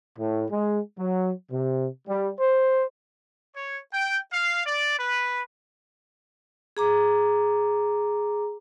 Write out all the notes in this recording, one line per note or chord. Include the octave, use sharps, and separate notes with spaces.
A2
G#3
F#3
C3
G3
C5
C#5
G5
F5
D5
B4
G#4 A#5 D6